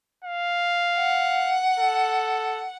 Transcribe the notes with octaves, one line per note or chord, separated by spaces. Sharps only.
F5
F#5
A4